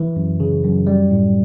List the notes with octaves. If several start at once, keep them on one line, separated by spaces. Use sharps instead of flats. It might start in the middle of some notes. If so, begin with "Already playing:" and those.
Already playing: E3
F#2
C#3
F#2
G3
A2